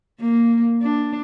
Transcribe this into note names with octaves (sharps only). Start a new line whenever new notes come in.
A#3
D4